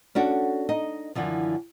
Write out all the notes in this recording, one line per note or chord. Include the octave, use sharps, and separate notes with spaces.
C#4 D4 F#4 A4
D#4 D#5
F#2 D3 E3 F3